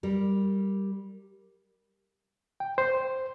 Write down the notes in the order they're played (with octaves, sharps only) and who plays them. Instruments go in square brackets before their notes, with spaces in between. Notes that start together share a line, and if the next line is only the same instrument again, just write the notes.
[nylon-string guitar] G3 A#4
[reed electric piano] G5
C5